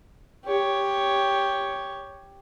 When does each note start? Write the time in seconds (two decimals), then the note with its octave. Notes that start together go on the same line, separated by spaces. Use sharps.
0.44 G4 C#5